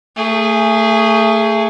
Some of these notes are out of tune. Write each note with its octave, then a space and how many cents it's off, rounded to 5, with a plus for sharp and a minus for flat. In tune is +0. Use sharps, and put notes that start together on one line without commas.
A3 +25 G#4 -5